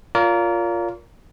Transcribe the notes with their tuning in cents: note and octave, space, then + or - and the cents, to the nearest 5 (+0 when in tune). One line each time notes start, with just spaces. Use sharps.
F4 +0 A#4 +0 D5 -40